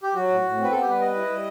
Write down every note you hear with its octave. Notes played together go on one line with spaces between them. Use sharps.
G4
F#3 F#4
A2
A2
C4
B4
B3 A4
G4
G3 B4
B4 D#5
E4
G3